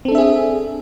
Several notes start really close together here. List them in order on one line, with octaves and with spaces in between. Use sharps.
C4 A4 D4 E5 G#4